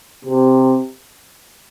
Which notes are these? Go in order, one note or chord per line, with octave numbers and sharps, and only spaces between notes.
C3